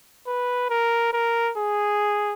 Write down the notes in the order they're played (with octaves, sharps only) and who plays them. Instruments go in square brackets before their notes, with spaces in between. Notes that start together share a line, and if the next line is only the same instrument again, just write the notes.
[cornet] B4
A#4
A#4
G#4